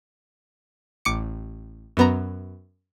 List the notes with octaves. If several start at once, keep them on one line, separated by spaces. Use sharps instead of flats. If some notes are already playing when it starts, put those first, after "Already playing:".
A1 D6 C#7
F#2 B3 A#5